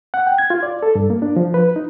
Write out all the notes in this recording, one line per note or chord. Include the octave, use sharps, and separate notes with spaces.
F#5
G5
G#6
F4
D5
A4
G2
A#3
D4
F3
B4
D#4